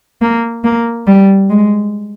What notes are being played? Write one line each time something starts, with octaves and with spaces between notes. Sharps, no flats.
A#3
A#3
G3
G#3